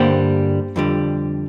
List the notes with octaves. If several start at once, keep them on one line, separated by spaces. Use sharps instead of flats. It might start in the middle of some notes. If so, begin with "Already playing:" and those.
Already playing: G2 D3 G3 A#3 G4 C5
F2 D3 G3